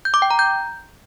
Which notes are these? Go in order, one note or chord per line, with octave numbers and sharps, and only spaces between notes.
G6
D6
G5
A#5
G6